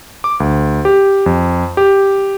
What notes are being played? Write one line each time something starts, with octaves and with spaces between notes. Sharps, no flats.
D6
D2
G4
F2
G4